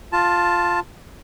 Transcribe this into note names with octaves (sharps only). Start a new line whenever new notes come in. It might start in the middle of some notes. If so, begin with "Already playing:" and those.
F4 A5